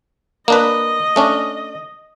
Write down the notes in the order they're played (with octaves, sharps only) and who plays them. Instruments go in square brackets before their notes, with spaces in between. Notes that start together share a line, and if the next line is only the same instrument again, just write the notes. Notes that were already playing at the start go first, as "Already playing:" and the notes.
[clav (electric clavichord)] A#3 D4 B4 [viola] D#5
[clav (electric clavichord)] A3 C#4 D4